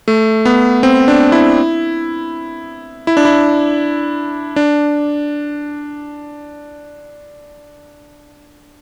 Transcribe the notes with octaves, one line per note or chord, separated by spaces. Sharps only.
A3
B3
C4
D4
E4
E4
D4
E4
D4